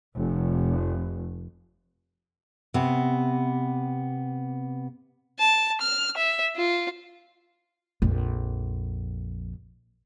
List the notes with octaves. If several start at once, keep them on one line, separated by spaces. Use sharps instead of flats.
F1
C3 B3
A5
F6
E5
F4
A#1 F2